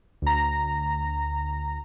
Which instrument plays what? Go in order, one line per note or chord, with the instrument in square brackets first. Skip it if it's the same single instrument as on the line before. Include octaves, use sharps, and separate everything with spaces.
[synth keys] D2 A#5